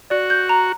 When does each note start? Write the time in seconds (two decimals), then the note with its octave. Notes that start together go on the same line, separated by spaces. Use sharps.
0.10 F#4 D5
0.30 G6
0.49 A#5